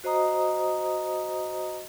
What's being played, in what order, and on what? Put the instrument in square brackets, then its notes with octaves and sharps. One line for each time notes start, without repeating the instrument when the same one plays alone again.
[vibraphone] F#4 C5 D#5 A#5 D#6